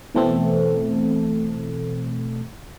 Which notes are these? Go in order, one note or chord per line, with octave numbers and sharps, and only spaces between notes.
B2 E3 A3 C4 A4